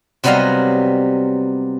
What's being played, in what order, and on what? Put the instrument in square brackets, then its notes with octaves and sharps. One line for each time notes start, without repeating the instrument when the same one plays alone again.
[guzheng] C3 F#3 G3 B3 D#5 F5